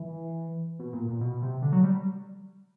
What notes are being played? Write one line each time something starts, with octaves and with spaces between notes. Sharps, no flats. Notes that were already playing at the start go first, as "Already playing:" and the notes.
Already playing: E3
B2
A#2
A#2
B2
C3
D3
F#3
G3